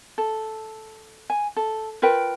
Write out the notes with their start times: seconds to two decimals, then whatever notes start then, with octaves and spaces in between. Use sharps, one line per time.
0.18 A4
1.30 G#5
1.56 A4
2.02 F4 A#4 B4 G5